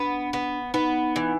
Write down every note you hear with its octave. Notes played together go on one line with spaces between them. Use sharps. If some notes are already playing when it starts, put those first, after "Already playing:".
Already playing: B3 D4
B3
B3 D#4
E3